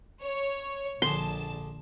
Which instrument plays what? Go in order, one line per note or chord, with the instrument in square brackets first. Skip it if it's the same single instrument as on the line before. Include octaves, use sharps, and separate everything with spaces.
[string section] C#5
[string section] A#1 A5 [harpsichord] D3 G#4 [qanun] C6